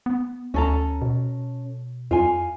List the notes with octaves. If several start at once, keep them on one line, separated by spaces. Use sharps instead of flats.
B3
D2 C#4 A4 A#5
B2
F2 F4 G#5